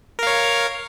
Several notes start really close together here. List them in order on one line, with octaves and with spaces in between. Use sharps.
A#4 F5 C#5